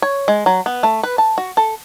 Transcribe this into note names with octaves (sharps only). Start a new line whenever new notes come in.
C#5
G#3
F#3
B3
A3
B4
A5
F#4
A4